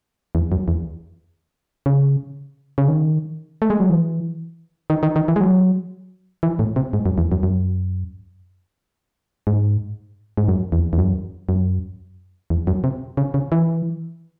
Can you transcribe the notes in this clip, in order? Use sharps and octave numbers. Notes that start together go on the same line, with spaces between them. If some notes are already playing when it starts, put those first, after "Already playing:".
E2
F#2
E2
C#3
C#3
D#3
A3
G#3
F#3
E3
D#3
D#3
D#3
E3
G#3
F#3
E3
A2
C3
G#2
F#2
E2
F#2
F#2
G#2
G#2
F#2
E2
E2
F#2
F#2
E2
F#2
C3
C#3
C#3
E3